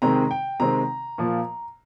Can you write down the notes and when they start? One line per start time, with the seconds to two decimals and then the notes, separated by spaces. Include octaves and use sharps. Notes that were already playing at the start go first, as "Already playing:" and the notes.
0.02 C3 D#3 G#3 C4 A#5
0.31 G5
0.60 C3 D#3 G#3 C4 A#5
1.18 A#2 F3 A#3